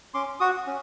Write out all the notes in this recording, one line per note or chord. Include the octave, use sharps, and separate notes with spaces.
C#4 C6 D6
F#4 C#6 D#6
C#4